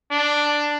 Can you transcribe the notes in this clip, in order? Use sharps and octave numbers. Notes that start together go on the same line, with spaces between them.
D4